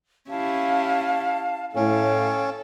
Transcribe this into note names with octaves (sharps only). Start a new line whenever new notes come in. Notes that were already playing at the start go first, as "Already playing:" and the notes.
C#4 E4 G4 F5 A5
A2 C#4 A4 C#5 F5 G5